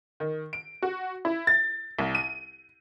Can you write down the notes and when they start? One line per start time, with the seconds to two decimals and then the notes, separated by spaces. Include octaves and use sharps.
0.20 D#3
0.53 D7
0.82 F#4
1.25 E4
1.47 A6
1.99 C2
2.15 D#7